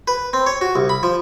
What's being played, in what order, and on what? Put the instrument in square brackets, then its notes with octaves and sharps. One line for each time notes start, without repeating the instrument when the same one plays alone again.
[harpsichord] B4
C4
C#5
F#4
C2
B5
F3